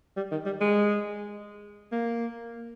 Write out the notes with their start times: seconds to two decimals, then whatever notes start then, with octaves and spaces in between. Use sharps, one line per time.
0.17 G3
0.31 D#3
0.46 G3
0.61 G#3
1.92 A#3